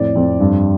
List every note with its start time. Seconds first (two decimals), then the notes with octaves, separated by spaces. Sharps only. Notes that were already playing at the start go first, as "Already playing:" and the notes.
Already playing: F2 A2 D5
0.15 F2
0.40 G2